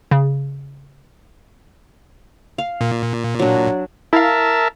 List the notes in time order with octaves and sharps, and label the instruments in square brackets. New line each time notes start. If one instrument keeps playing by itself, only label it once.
[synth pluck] C#3
[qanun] F5
[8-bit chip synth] A#2
[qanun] F#3 D4
[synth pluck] E4 F5 [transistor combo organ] A#4 E5 A5